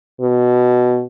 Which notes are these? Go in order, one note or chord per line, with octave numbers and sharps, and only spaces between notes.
B2